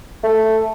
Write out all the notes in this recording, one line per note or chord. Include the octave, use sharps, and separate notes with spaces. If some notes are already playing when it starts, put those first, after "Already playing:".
A3